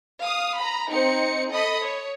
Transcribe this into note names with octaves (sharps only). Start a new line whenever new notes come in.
F5 D#6
A#5 B5
C4 D#4 C#7
A4 D#5 B5 D#6
C#5